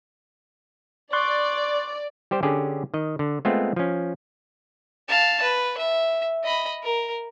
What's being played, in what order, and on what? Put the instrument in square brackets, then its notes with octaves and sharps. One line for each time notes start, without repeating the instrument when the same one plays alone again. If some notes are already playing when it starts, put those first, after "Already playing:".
[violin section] D5 [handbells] C6 C#6 F#6
[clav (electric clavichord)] G3 G4 C5
D3 C#4 G4 G#4
D#3 D#5
D3
G#3 A3 B3 C4 F4
F3 C#4
[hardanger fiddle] F5 A5
B4
E5
D#5 B5
A#4